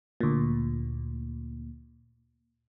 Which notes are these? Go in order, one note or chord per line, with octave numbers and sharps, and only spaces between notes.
D2 A#2